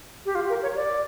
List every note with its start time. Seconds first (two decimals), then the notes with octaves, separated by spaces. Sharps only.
0.26 G4
0.35 F4
0.49 A#4
0.63 C#5
0.76 D5